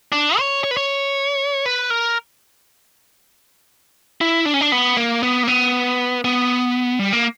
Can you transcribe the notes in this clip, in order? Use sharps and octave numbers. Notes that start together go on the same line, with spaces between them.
D4
C#5
C#5
B4
C#5
B4
A#4
E4
D4
C#4
D4
B3
A#3
B3
A#3
B3
B3
G3
A#3